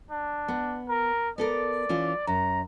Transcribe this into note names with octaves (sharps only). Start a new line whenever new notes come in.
D4
B3
A#4
B3 A4 A#4 D5
E3 C#4 F4
F#2 A#5